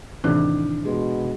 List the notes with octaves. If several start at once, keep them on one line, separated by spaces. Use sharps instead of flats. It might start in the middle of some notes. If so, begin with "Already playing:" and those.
A2 C3 D#3 E3 D4
B2 G#3